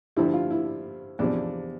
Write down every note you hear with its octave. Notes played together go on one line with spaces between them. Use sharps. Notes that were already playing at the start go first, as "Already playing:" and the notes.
G2 D3 F3 E4
F4
E4
E2 C3 F3 D4